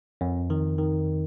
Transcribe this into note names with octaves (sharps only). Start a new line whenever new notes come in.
F2
D#3
D#3